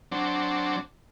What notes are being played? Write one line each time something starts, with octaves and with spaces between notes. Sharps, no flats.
F#3 C4 D4